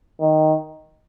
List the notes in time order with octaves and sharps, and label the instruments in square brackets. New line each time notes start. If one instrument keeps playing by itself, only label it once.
[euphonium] D#3